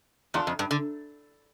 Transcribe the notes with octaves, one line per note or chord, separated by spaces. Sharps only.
E2 D4 F4 A4
F2
G2
D3